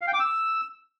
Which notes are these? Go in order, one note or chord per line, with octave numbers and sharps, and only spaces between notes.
F5
G5
D6
E6